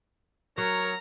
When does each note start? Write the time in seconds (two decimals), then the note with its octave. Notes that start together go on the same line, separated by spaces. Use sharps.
0.58 F#3 A#4 C#5 A#5